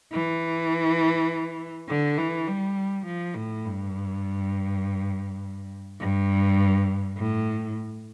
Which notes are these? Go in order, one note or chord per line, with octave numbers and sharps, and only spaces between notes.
E3
D3
E3
G3
F3
A2
G2
G2
A2